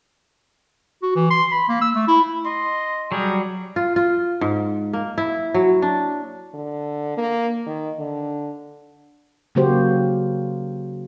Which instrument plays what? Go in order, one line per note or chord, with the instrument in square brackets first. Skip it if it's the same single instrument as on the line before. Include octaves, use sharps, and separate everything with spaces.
[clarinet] F#4
E3
C6
B5
A#3
E6
A3
E4
[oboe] D#5 [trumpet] C6
[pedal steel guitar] F#3 G3 [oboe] G#4 [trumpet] G5
[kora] F4
F4
G#2
A#3
E4
F#3
D4
[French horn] D3
A#3
D#3
D3
[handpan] C#3 F#3 A#3 F#4 G4 C5